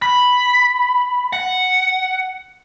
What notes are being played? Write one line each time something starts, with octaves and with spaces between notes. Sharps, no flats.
B5
F#5